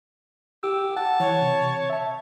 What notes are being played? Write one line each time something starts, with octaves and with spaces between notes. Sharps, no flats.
G4 E6
F#5 A5
E3 C#5
C3
E5 A5